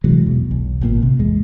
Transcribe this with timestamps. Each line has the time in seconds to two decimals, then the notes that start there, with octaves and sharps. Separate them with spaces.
0.04 C3 E3 F#3 G#3
0.26 E2 B2
0.51 B1
0.81 G#1 A#2 A#3
1.02 C3
1.19 E2 G#3